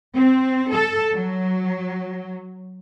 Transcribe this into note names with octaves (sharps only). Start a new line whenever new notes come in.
C4
A4
F#3